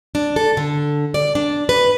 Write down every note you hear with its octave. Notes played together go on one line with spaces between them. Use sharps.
D4
A4
D3
D5
D4
B4